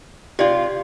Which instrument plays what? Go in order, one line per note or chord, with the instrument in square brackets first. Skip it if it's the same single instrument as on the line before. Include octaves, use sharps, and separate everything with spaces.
[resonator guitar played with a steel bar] C3 F4 [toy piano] G4 D5